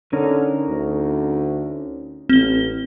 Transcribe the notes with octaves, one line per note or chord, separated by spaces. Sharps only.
D3 C#4 D#4 A#4
D2
A1 C4 G7